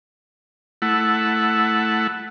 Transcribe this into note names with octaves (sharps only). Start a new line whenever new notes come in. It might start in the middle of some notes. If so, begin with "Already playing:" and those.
A3 E4 F#5